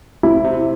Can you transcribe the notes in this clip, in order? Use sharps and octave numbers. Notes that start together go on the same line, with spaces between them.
C3 E4
C3